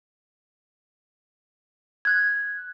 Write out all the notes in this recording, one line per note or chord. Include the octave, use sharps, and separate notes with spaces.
F#6 G#6